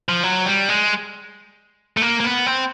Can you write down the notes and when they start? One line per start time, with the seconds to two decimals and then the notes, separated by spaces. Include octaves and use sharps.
0.09 F3
0.24 F#3
0.46 G3
0.69 G#3
1.97 A3
2.02 A#3
2.20 A#3
2.25 B3
2.46 C4